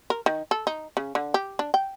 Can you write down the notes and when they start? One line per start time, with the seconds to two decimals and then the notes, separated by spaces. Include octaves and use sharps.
0.10 A#4
0.26 D#3
0.51 A4
0.67 D#4
0.97 C#3
1.15 D3
1.34 G4
1.59 D4
1.74 G5